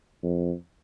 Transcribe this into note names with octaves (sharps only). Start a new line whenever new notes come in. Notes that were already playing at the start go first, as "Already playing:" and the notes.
F2